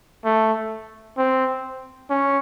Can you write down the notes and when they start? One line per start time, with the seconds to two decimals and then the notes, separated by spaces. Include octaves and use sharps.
0.25 A3
1.17 C4
2.10 C#4